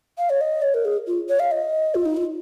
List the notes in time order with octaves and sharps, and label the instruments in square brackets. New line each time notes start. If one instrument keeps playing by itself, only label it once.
[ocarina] F5
C#5
D#5
C#5
A#4
G#4
F4
C#5
F5
D#5
F4
D#4
F4